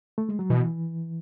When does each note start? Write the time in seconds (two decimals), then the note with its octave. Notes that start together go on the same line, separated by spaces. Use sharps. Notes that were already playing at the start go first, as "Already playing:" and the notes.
0.18 A3
0.29 G#3
0.39 F#3
0.50 B2 E3